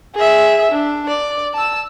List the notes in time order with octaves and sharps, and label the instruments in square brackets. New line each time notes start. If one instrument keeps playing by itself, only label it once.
[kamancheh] G#4 E5
D4
D5
A5 E6